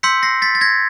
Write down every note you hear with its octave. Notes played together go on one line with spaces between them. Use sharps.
C6 E6 G6 B6 C#7
A#6 C7
A6 B6
A6
G#6 A#6